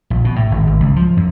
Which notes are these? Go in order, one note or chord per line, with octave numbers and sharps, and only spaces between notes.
A#1
B2
A2
G#1
G#1
C#2
F3
F#2